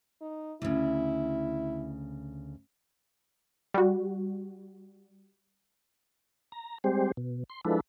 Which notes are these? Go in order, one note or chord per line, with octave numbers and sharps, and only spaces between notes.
D#4
D2 C#3 E4
G3 F#4
A#5
G3 G#3 C4 G4 C5
B2
C6
F3 G#3 D4 E4 A4 B4